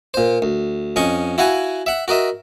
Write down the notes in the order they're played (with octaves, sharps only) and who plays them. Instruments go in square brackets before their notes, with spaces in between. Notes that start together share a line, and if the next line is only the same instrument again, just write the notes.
[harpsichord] A#2 C5
D2
F2 C#4 D#5 C#6
E4 F#4 F5 F#5 G#5
E5 F#5
F#4 A#4 D#5 E5